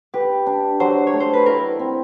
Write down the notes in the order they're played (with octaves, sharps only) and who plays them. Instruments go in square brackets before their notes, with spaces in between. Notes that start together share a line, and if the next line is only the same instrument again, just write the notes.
[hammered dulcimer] G4 [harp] B4
[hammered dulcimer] D4
[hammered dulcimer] F#3 [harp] C5
[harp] C#5
[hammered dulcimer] A3
[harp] C5
B4
[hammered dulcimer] E4 [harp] A#4
[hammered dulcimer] C4